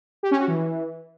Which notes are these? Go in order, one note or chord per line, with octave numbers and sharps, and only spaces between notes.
G4
C#4
F#4
E3